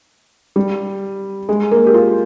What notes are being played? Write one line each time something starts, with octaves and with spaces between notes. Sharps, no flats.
G3
G#3
A#3
G4
F4